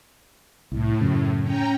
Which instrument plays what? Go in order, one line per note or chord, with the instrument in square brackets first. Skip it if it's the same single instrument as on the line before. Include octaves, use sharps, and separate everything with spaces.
[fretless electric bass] C2 [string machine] A2
[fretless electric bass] F#2 C#3
[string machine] C#4 G5 A#5